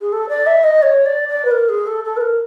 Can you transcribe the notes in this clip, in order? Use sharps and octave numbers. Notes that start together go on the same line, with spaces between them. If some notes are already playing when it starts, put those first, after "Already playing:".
G#4
A4
D5
E5
D#5
C#5
D5
D5
B4
A#4
G#4
A4
A4
B4
A#4